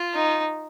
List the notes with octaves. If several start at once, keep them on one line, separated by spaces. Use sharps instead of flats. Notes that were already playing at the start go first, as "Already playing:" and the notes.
Already playing: F4
D#4